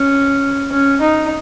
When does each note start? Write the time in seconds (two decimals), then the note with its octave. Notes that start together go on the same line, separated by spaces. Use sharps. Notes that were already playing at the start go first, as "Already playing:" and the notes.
Already playing: C#4
0.71 C#4
1.01 D#4